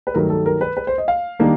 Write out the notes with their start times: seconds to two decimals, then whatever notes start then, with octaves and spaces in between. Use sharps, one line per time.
0.07 B4
0.14 G2 D#3 F#3 A3 A#4
0.30 A4
0.46 A#4
0.61 B4
0.77 B4
0.87 C5
0.98 D#5
1.08 F5
1.39 D#3 G3 A#3 D4